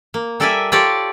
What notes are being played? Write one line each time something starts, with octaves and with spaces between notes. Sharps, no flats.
A#3
G3 A4 A#4 D5 E5 G#5
F4 G4 A4 C#5 D5